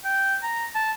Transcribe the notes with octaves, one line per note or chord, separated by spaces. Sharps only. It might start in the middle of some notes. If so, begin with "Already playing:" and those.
G5
A#5
A5